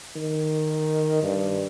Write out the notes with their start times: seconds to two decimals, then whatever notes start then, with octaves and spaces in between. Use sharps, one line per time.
0.16 D#3
1.23 G2